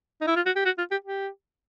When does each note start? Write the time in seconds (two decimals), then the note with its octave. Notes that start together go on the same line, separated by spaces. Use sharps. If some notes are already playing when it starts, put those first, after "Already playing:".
0.21 D#4
0.27 E4
0.36 F4
0.46 F#4
0.56 G4
0.65 F#4
0.78 F4
0.91 G4
1.04 G4